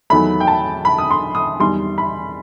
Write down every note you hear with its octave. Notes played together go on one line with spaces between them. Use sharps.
E2 D#3 F#3 A3 B5
G5
A5
B5
D#6
C6
D#6
E2 D#3 G3 C6
B5